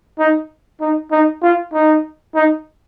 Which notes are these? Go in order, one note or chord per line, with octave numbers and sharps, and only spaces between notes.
D#4
D#4
D#4
F4
D#4
D#4